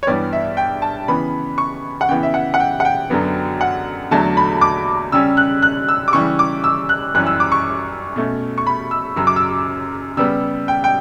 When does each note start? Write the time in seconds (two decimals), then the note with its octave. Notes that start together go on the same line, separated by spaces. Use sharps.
0.03 C#5
0.07 G2 E3 G3 B3 D5
0.33 E5
0.57 G5
0.82 A5
1.08 C#3 E3 B3 B5
1.58 C#6
2.01 F#5
2.09 C#3 E3 B3 G5
2.23 E5
2.34 F#5
2.54 F#5
2.60 G5
2.80 F#5
2.85 G5
3.10 F#2 D3 F#3 B3
3.61 F#5
4.11 E2 D3 F#3 A3 A5
4.37 B5
4.61 D6
5.12 C#3 G3 C#4 E6
5.37 F#6
5.62 F#6
5.88 E6
6.08 D6
6.13 C#3 E3 G3 C#6
6.39 D6
6.64 E6
6.89 F#6
7.14 F#2 E3 G3 C#4 F#6
7.27 E6
7.40 D6
7.52 C#6
8.16 B2 A3 C#4
8.58 C#6
8.67 B5
8.91 E6
9.16 F#2 C#3 F#3 E6
9.27 D6
9.36 E6
10.17 C#3 G3 B3 E6
10.68 G5
10.84 G5